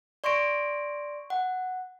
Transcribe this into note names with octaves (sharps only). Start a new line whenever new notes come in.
D5 C6 C#6 A#6 D7
F#5